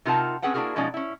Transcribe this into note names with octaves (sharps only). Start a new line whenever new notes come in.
C3 D#4 F4 A#4 F#5 A5
C4 C#4 G#4 B4 F#5 G5
A#3 D4 E4 F#4 G#4 A#4
B2 F3 G#3 C#4 D#4 D5
C#4 E4